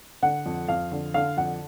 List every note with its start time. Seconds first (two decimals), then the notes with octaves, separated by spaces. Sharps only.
0.23 D3 F#5
0.46 F2
0.68 F2 F5
0.92 D3
1.14 D3 F5
1.37 F2 F#5